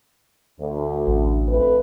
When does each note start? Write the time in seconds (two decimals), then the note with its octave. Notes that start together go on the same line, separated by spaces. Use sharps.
0.60 D2
1.07 A1
1.48 F2 A3 B4